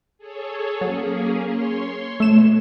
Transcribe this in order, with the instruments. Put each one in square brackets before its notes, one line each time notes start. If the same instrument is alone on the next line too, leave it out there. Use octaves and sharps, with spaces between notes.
[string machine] G#4 A4 C#5
[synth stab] F#3 [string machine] A#3 C#4 G#4
[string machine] C#5 C6
[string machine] B2 [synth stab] A3 E7